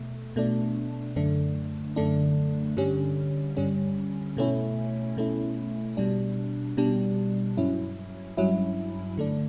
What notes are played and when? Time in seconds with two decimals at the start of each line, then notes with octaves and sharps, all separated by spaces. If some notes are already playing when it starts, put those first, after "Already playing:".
Already playing: B2 A3
0.36 B2 A3 D4
1.16 F#2 D3 A3 D4
1.96 F#2 D3 A3 D4
2.77 G2 D3 G3 C#4
3.57 G2 D3 G3 C#4
4.37 B2 A3 C#4 E4
5.17 B2 A3 C#4 E4
5.97 B2 G3 D4
6.77 B2 G3 D4
7.57 G2 F#3 C#4 E4
8.37 G2 F#3 C#4 E4
9.17 D3 A3 D4